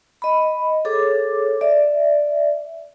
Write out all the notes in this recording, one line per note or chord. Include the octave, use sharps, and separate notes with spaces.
D#5 B5
G#4 A4 C#5 D6
D5 E5